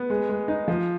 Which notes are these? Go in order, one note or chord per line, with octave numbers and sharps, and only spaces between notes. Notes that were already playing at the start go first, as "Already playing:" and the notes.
Already playing: B3
G#3
G#3
D#4
F3